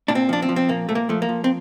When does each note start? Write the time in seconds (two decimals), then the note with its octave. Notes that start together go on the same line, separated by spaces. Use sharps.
0.08 A#2 D4
0.15 C4
0.29 F3 D4
0.42 C4
0.49 F3
0.56 C4
0.69 A#2 A#3
0.89 A#2 A3
0.95 A#3
1.09 F3 A3
1.22 A#3
1.29 F3
1.44 C4